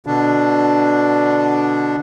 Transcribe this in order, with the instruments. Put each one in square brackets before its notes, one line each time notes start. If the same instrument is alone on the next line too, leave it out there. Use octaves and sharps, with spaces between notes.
[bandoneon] B2 D3 D4